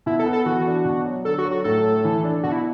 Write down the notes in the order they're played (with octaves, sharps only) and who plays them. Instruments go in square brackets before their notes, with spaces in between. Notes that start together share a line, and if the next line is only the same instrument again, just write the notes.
[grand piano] B2 [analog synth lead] E4
[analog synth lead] A4
[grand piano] B3
[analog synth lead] A4
[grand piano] E3 [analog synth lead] F#4
[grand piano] D4
B2
F#3
[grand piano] D3 [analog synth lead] A4
[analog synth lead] F#4
[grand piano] F#3
[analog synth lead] F#4
[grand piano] A2 [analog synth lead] A4
[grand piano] A3
E3
D4
[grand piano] B2 [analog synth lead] F#4
[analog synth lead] E4